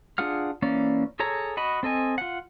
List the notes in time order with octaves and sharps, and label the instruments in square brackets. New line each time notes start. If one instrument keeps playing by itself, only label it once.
[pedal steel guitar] D4 F4 G#4 F#5 F6
E3 A#3 C#4 D5
G#4 A4 C#5 A#5
F#4 D#5 B5
C4 A4 D#5 G#5
F4 F#5